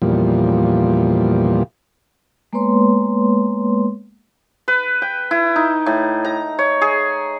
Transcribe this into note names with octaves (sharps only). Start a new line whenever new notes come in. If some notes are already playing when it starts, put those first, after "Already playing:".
E2 A#2 F3 G3
G#3 A#3 B3 B4 C#5 C6
B4
G5
E4
D#4
A2
A#5
C#5
G#4